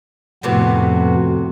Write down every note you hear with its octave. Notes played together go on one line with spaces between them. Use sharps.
F2 A2 C3 B3 F#4